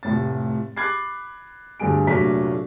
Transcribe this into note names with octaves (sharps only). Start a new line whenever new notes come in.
F1 A2 A6
B5 D6 F#6 G#6 A6 C7
D1 G2 D3 G#4 D7
F1 A#2 F#3 A3 D4 B6